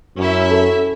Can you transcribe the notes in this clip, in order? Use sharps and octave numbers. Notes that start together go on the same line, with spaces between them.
F#2 C#4 E4 E5
A4